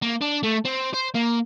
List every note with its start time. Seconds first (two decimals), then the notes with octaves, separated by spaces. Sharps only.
0.02 A#3
0.21 D4
0.43 A3
0.65 C4
0.94 C5
1.15 A#3